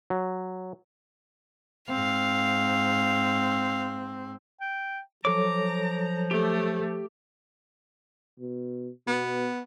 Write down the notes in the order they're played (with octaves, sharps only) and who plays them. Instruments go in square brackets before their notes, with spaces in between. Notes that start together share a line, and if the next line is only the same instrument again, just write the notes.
[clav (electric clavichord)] F#3
[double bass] G#2 C4 [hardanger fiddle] F5
[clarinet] G5
[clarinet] F3 [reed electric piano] F#3 A4 C#5 [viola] A#5 [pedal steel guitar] D6
[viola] A3 [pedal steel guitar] G4
[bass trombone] B2
[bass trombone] B2 [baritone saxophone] B3